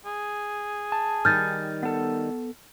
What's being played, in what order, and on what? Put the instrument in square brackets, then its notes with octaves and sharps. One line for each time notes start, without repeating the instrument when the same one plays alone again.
[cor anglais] G#4
[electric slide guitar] A5
[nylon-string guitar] D#3 G3 D#4 [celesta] F6 G6 A6
[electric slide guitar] B3 A4